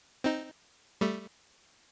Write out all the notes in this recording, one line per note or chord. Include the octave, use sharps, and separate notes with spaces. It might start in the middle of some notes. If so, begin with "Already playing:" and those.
C4 D#4
G3 A3